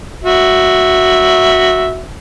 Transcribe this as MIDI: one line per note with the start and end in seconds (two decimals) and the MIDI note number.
0.24 2.02 66
0.24 2.02 76